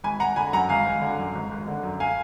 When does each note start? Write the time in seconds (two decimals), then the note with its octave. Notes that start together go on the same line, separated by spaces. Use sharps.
0.04 G#1 G#5 B5
0.20 G#1 F#5 A#5
0.36 D3 G#5 B5
0.53 F#2 F#5 A#5
0.69 G#1 F5 G#5
0.86 G#1
1.02 D3
1.18 F#2
1.35 G#1
1.51 G#1
1.68 D3
1.83 F#2
2.00 F5 G#5